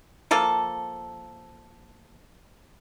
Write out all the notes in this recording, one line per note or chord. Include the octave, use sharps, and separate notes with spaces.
F3 A#3 A4